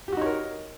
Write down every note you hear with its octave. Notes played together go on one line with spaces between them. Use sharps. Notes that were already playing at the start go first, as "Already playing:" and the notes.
D#4 F#4 G4 A#4 C#5